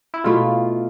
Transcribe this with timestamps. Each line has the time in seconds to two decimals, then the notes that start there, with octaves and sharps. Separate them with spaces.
0.14 E4
0.24 B2 A3 E4 F4